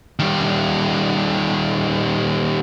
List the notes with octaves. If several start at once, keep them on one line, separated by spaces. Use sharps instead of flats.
D#3 G3